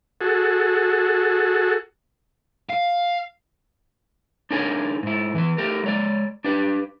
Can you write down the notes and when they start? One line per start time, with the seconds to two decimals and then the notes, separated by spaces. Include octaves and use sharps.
0.21 F#4 G#4 A4
2.70 F5
4.51 D4 D#4 G#4 A#4 C#5 G#5
5.03 G#2 E4
5.35 E3 B3 B4
5.58 A3 G4 A#4
5.84 G#3 C#5 D5
6.44 D4 G4 B4